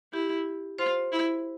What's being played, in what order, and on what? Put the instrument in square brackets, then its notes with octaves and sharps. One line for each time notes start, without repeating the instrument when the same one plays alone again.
[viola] E4 [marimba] G4
[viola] F4 [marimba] C5
[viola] E4